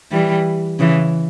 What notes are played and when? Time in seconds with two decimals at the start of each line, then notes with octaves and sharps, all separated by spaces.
0.11 E3 G3
0.79 C#3 E3